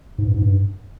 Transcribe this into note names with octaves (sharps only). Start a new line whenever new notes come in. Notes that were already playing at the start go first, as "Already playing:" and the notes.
G#2
G2
G#2
G2